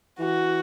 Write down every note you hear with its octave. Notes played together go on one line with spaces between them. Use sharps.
E3 F#4